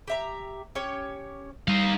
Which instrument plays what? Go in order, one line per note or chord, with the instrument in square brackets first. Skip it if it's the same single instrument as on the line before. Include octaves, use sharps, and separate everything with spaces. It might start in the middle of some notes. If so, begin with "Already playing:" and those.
[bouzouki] G4 E5 A#5
C#4 G4 C#5
[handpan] G3 [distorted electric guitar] D#4 F5